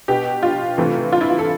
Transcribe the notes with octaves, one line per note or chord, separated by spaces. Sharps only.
B2 B3 G4
F4
C3 E3 A3 C4
F4
E4
F4
A4